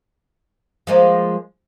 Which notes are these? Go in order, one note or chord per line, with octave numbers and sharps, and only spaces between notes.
F3 G#3 A#3